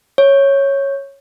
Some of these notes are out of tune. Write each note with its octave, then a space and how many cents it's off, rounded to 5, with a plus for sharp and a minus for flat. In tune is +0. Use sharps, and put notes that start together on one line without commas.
C#5 -5